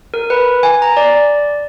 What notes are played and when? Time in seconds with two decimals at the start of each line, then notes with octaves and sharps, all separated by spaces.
0.14 A#4
0.30 B4
0.63 G#5
0.82 A#5
0.97 D5